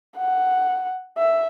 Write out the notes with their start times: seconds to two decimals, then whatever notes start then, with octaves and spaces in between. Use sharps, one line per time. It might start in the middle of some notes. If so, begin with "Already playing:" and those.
0.18 F#5
1.18 E5